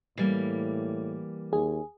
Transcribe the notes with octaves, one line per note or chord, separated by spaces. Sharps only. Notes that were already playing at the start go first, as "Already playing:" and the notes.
A2 E3 G3 A#3
D#2 G#4